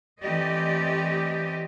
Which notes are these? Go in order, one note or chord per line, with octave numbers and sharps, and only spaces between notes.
E3 A3 C4 G4 D5 D#5